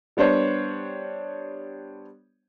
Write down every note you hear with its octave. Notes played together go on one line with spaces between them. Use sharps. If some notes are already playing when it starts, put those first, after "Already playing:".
G3 B3 D4 C5 C#5